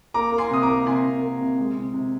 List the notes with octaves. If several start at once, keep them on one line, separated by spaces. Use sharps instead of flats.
A#3 A#5 D6
A#3
G#5 C6
C3 D#6
A#5 D6
A#3
C3 G#5 C6
C3
A#3
C3
G#3
C3
C3